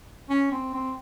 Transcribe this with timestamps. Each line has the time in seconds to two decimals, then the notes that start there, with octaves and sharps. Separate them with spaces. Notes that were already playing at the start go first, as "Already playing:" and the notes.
0.30 C#4
0.52 C4
0.74 C4